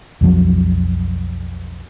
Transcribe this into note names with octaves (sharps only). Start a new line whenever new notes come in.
B1 F2 F3 F#3